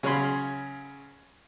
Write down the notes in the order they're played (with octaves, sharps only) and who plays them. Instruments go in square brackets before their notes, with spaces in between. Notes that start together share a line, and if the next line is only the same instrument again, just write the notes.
[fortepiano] C#3 F#3 C#5 F5 B5 C6